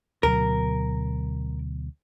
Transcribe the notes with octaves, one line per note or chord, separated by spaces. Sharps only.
D2 B2 F#3 A#4